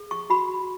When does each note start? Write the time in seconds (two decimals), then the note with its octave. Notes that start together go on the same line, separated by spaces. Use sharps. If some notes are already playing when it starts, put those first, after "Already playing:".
Already playing: G#4
0.11 C#6
0.30 F#4 B5